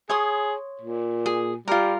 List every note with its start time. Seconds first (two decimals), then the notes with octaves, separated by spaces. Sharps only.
0.09 G#4 C#5 C6 D#6
0.81 A#2
1.26 G#4
1.68 G3 F4 A#4